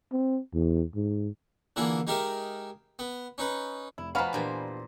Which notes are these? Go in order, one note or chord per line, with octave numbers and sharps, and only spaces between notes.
C4
E2
G#2
D3 E3 A#3 F4 G#4
G#3 D#4 G4 A#4 E5 F5
B3
C#4 D#4 B4
F1 E4
B2 F3 F#4 B4 F5 G#5 A#5 B5
E2 A#2 D4 G4 B4 C5